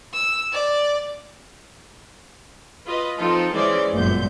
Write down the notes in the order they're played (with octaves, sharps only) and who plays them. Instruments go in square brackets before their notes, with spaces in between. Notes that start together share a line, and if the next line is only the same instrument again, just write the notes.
[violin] E6
D5
[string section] F4 B4 D#5
F3 C4 D#4 F4 A4
E3 G#3 C#4 G#4 C5 D5
G1 C#2 F#2 A#2 G6